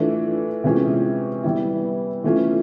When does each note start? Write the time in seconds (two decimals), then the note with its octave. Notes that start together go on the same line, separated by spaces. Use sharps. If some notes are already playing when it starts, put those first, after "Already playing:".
Already playing: E3 A3 D4 F4
0.64 C3 E3 G#3 C#4 F4
1.44 E3 G3 B3 E4
2.24 E3 A3 C#4 F4